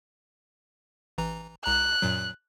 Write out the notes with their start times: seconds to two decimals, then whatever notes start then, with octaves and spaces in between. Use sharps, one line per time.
1.18 A1 E3 A#5
1.65 C2 A#5 F#6
2.02 F#2 A#2 F#3